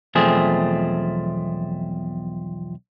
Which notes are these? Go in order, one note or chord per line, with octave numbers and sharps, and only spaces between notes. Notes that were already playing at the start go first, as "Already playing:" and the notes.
B1 E2 F3 A3 C4 G#4